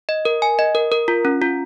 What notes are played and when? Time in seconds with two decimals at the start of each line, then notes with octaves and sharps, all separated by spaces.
0.09 D#5
0.25 A#4
0.42 G#5
0.59 D#5
0.75 A#4
0.92 A#4
1.08 F4
1.25 C#4
1.42 F4